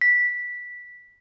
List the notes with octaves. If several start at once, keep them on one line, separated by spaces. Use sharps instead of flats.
B6